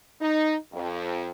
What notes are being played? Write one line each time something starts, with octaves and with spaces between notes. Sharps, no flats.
D#4
F2